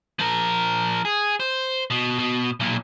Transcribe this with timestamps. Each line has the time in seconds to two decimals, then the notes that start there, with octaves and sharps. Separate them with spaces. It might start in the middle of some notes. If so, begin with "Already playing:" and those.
0.19 F3 A#4
1.05 G#4
1.40 C5
1.90 B2
2.19 B2
2.60 B1 A#2